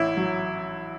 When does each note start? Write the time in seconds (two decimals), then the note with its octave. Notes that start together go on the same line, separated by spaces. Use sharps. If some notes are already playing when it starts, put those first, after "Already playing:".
Already playing: A1 E4
0.17 F#3